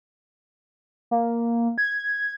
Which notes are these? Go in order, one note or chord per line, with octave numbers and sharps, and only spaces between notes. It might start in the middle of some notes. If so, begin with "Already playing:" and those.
A#3
G#6